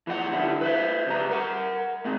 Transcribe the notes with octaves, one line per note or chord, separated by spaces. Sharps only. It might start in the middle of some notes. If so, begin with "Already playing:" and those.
E3 F3 B4 F#5
D3 G3 E4
B4 C5 E5
C#2 G3 A#5
A#4 F#5
G#2 G#3 C4